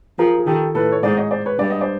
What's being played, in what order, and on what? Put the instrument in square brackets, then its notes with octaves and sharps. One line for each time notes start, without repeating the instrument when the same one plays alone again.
[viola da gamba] F3 [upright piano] G#4 A#4
[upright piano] G#4
[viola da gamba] D#3 [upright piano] G4 A4
[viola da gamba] A2 [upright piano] A4 B4
[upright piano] C#5
[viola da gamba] G#2 [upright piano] C5 D5
[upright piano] C#5 D#5
C5 D5
B4 C#5
[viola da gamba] G2 [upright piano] D5
[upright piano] D#5
C5 D5